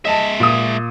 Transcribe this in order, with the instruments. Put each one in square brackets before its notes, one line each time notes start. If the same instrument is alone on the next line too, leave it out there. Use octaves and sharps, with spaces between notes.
[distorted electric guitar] G#3 E5 [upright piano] D#5 A5
[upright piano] A#2 D#6